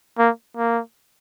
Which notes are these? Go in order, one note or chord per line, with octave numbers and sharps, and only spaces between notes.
A#3
A#3